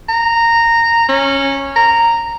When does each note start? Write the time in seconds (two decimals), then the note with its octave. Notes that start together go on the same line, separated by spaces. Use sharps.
0.09 A#5
1.09 C#4
1.76 A#5